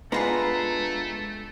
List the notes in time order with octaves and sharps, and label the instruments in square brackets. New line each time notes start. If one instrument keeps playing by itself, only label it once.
[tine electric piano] G#3 [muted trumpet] A3 [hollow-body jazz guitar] B3 D4 F4 [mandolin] G#4 B4 A#5